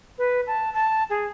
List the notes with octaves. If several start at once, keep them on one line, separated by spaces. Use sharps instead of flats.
B4
A5
A5
G#4